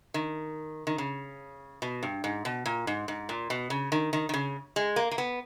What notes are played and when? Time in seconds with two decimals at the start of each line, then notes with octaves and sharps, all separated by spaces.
0.14 D#3
0.87 D#3
0.98 C#3
1.82 B2
2.03 G2
2.24 G#2
2.45 B2
2.66 A#2
2.87 G#2
3.08 G#2
3.29 A#2
3.50 B2
3.70 C#3
3.92 D#3
4.13 D#3
4.29 D#3
4.34 C#3
4.76 G#3
4.96 A#3
5.11 A#3
5.18 B3